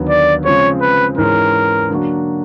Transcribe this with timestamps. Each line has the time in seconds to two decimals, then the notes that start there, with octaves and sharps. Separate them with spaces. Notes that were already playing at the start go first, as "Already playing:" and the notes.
Already playing: D#2 D3 F#3 B3
0.09 D5
0.45 C#3 F3 G#3 C4 C#5
0.81 B4
1.17 G#2 E3 G#3 C#4 A#4
1.89 D3 F#3 A#3 D4 F#4